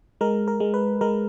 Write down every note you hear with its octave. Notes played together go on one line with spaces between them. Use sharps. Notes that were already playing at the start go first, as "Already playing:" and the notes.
G#3 A#4
A#4
G#3
B4
G#3 A#4